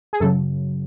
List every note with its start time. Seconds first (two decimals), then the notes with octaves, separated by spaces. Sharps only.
0.13 G#4
0.20 F#2 C#3 F#3 A4